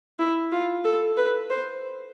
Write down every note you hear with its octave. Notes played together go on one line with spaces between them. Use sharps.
E4
F4
A4
B4
C5